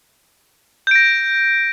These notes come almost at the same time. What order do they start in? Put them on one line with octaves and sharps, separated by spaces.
G6 D7 A#6